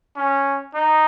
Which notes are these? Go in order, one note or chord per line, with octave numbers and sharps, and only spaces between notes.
C#4
D#4